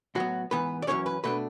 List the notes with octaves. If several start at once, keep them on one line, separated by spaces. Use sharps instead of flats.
A2 F#3 B3 F#4
G#2 E3 B3 B4
D5
F#2 E3 A3 C#4 C#5
B4
B2 A3 D4 B4